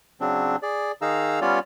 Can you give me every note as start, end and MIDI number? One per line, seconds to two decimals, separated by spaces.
0.21 0.56 49
0.21 0.56 54
0.21 0.56 60
0.21 0.56 62
0.63 0.92 68
0.63 0.92 74
1.02 1.40 51
1.02 1.40 63
1.02 1.40 68
1.02 1.40 77
1.02 1.40 82
1.02 1.40 88
1.42 1.59 55
1.42 1.59 59
1.42 1.59 61
1.42 1.59 65
1.42 1.59 73
1.42 1.59 74